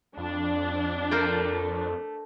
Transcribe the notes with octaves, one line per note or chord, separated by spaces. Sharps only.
F2 D4
A3 A#4 C5 D5